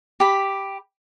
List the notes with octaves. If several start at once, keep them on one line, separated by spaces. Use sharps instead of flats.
G4 B5